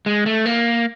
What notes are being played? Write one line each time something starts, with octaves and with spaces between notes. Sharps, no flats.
G#3
A3
A#3